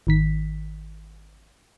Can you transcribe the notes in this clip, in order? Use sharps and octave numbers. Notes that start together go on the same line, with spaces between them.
G#1 D#3 B6